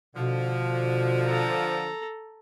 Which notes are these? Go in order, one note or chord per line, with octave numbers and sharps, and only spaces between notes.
B2 D3 F3
A4 A#5